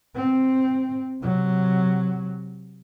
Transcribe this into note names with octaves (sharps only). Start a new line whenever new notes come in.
C4
C3 F#3